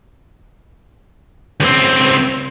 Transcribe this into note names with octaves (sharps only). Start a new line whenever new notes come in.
C#2 C4